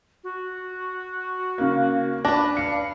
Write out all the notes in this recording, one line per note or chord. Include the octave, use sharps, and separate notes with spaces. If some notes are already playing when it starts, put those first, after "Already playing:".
F#4
C#3 A#3
D4 B4 A#6
F5 C#7